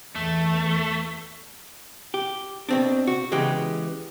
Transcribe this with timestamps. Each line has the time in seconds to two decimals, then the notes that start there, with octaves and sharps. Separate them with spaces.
0.15 E2 A3
2.14 G4
2.69 B2 C4 D4
3.07 F#4
3.32 C#3 E3 G#3 B3 G4